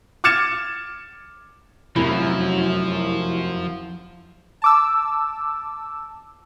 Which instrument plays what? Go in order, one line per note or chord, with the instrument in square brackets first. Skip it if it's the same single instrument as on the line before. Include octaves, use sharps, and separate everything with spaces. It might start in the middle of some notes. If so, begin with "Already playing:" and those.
[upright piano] D6 F6 G#6 A6 C#7 E7
[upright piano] F1 C3 [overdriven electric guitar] F#2 [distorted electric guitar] F3 [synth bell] E4
[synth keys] A5 D6 E6